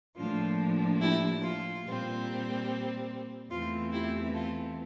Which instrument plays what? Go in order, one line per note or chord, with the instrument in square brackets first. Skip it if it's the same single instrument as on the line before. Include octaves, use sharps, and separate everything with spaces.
[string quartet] A2 F3 A#3 D4 F4
E4 G4
F4
A#2 G3 C4
E2 E3 A3 C4 F4
E4 G4
F4 A4